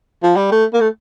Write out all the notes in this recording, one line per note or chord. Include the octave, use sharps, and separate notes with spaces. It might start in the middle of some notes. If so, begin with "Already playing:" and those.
F3
G3
A3
A#3
A3